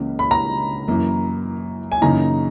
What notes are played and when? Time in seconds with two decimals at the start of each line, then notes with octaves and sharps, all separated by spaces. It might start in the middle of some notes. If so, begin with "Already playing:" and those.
Already playing: C#2 C#3 E3 A#3
0.19 B5
0.31 A#5
0.88 F#2 E3 A#3
1.92 G#5
2.02 F#2 C#3 E3 A#3 D#4 A#5